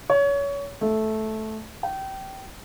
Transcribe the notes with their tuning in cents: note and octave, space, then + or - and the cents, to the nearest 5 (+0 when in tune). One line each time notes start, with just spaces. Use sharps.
C#5 +25
A3 -10
G5 -25